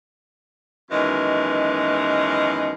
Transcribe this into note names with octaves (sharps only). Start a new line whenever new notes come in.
F#2 B2 D#3 E3 G#3